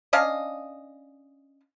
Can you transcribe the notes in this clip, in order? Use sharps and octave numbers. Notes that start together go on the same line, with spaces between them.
C#4 D4 D#5 F5